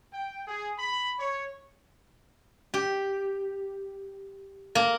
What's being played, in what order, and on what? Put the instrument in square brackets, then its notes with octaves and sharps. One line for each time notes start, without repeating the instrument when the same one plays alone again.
[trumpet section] G5
G#4
B5
C#5
[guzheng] G4
A#3